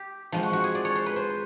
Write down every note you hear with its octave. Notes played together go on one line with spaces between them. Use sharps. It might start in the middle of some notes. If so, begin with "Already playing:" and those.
Already playing: G4
F3 G#3 C4
F#4
F#4
G#4
D5
C#5
C5
B4
C5